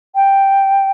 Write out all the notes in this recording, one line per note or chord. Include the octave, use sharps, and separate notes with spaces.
G5